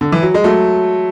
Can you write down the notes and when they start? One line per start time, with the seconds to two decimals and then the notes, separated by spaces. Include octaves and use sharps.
0.01 D3
0.12 E3
0.22 F#3
0.34 G#3
0.44 F#3 A3